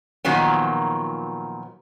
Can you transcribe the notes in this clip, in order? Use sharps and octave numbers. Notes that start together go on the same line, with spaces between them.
A#2 D#3 F3 F#3 B3